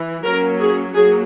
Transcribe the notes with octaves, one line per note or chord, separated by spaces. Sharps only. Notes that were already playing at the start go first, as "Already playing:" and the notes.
Already playing: E3
F#3 A#3 C#4 A#4
G#4
F#3 A#3 G#4